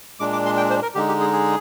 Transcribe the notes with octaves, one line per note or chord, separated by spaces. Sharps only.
A#2 G#3 D4 D6
D6
C6
G5
C5
A#4
D3 G#3 D#4 G4
G4
G#4
G#4